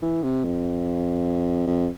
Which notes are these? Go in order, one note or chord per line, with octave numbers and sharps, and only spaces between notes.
E3
C3
F2
F2